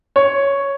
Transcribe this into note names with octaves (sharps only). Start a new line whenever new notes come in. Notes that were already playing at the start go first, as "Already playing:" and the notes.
C#5